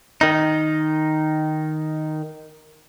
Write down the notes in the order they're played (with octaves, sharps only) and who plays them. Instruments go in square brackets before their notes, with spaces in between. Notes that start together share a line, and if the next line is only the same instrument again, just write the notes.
[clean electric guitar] D#3 D#4